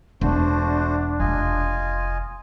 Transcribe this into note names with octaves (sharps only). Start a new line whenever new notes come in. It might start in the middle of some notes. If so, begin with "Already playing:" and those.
E1 A3 D4 F#4 C5
F1 F4 D#5 G#5